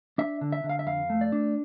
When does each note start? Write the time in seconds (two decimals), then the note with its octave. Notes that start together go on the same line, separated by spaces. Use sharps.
0.18 D4 E5
0.41 D3
0.52 E5
0.64 D3
0.69 F5
0.79 E5
0.87 F2 F5
1.10 A3
1.21 D5
1.32 D4